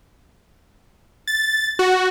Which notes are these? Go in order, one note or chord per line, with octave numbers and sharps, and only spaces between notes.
A6
F#4